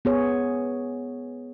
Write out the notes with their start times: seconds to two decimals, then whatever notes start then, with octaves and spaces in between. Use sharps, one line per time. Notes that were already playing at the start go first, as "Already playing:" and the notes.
0.05 B3 G#4 C#5